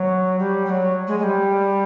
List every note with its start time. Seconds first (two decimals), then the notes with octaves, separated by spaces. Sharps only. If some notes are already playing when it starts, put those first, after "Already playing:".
Already playing: F#3
0.38 G3
0.65 G3
0.69 F#3
1.07 G#3
1.18 G#3
1.23 G3